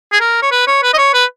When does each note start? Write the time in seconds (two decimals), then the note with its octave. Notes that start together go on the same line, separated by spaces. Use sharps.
0.12 G#4
0.21 A#4
0.42 C#5
0.51 B4
0.67 C#5
0.83 B4
0.94 D#5
0.98 C#5
1.14 B4